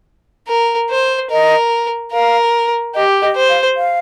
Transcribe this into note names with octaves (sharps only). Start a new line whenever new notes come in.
A#4
C5
A#4 D#5
A#4 F5
G4 D#5
D#5
C5
F5
F5